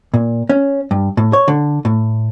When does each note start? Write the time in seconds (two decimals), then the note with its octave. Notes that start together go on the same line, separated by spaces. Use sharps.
0.14 A#2
0.50 C#4
0.91 G2
1.17 A2
1.33 C#5
1.48 D3
1.85 A2